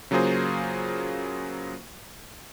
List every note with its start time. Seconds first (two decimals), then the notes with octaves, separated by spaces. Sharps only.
0.11 C#3 F#3 A#3 F4 G#4 C5